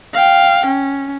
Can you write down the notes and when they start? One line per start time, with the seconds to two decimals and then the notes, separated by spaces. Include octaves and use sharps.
0.14 F5 G5
0.66 C#4